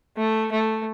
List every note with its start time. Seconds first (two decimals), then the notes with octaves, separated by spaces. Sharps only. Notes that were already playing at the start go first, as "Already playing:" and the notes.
0.17 A3
0.52 A3